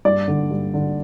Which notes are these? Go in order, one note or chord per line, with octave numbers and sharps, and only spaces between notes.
G2 D5
D3
G2
D3